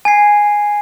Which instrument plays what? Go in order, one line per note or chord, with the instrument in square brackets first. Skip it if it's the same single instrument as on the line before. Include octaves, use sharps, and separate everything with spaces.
[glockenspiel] G#5 G#6 C7